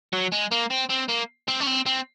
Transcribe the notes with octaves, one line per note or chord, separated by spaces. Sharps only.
F#3
G#3
A#3
C4
C4
A#3
C4
C#4
C4
C4